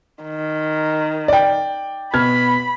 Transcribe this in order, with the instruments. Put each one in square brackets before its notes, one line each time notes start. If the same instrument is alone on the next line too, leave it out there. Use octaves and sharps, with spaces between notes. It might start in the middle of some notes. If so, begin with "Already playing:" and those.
[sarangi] D#3
[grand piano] D5 G5
[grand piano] B2 F6 G#6 [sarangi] B5